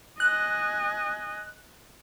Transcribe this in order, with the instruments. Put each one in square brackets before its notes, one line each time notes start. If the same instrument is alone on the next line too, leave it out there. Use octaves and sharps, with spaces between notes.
[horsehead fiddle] D#5 G#5 [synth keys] F#6